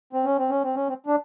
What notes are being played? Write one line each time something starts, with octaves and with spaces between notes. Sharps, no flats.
C4
C#4
C4
C#4
C4
C#4
C4
D4